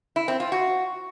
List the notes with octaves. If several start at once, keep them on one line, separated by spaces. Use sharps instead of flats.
E4
C4
F4
F#4